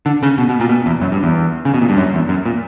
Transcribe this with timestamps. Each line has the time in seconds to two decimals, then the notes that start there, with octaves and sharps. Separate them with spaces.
0.06 D3
0.23 C#3
0.38 B2
0.49 B2
0.60 A#2
0.69 B2
0.86 E2
1.01 F#2
1.12 G2
1.23 E2
1.65 C#3
1.74 B2
1.82 A#2
1.89 G2
1.97 F#2
2.14 E2
2.29 F#2
2.46 A#2